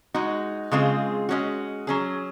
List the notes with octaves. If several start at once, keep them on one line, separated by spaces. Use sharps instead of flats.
G#3 D#4 F#4
C#3 G#3 C4 F4 G#4
G#3 C#4 F#4
F#3 C#4 G#4